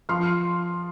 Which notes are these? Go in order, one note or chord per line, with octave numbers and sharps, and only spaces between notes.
F3 C6 F6